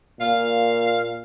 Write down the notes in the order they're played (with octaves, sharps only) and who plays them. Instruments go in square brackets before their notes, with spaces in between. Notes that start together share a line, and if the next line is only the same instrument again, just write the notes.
[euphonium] A#2 [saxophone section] F5